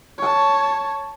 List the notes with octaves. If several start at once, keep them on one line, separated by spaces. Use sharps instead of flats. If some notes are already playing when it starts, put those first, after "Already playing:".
C#5 A5